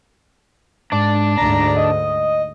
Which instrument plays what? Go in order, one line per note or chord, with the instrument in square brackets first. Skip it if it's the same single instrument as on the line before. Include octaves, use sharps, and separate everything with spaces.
[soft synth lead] G#2 [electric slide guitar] D4 D5
[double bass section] D2 G#2 [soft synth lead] A#5
[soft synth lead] D#5